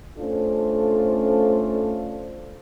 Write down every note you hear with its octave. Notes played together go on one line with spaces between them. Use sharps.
A3 C#4 D4 F4 A4 C5